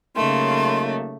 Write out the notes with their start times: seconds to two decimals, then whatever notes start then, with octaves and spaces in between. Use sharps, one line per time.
0.16 C#3 F#3 A3 A#3 D#4 C6